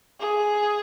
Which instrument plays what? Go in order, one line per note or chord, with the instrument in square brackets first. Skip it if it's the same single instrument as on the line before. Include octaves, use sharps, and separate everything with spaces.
[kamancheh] G#4